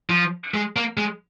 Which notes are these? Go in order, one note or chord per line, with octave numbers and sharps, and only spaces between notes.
F3
G#3
A#3
G#3